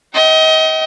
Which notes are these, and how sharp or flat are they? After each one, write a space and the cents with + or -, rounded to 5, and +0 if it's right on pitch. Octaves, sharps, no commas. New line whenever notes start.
D#5 +30 G5 -30